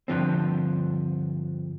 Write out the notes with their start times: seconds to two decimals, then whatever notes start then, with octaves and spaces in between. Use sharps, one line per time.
0.08 G2 D3 F3 C4